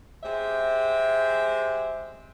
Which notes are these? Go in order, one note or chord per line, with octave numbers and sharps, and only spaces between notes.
G#3 C4 G4 C5 E5